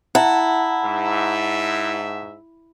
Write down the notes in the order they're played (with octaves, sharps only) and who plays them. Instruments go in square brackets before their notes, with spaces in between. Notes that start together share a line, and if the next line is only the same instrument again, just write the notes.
[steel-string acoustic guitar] E4 [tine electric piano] F#5 A5 A#5
[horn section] G#2 E5